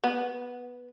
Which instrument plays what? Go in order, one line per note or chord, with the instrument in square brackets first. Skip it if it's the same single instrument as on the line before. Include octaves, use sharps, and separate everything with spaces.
[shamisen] B3